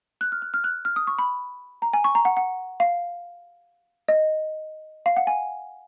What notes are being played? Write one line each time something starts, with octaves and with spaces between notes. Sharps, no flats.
F#6
F6
F#6
F6
F#6
F6
D#6
C#6
B5
A#5
G#5
C#6
A#5
F#5
F#5
F5
D#5
F5
F#5
G#5